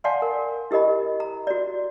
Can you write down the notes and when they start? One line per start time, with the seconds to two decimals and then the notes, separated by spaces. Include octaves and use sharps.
0.04 D5 F5 F#5 G#5 A5 C6
0.22 A#4
0.71 E4 G4 A#4 D#5 B5
1.20 A#5
1.47 F#4 D5